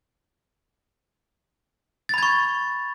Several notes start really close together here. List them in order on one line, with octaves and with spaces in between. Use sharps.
A6 B5 G#6 C#6